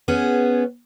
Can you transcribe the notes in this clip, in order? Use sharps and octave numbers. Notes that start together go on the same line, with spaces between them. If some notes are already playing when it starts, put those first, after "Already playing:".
B3 C#4 G#4